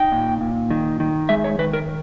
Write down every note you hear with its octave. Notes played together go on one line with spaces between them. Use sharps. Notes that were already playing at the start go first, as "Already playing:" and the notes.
Already playing: D#4 G5
A#2
A#2
D#3
D#3
G#3 E5
C#5
D#3 B4
A#4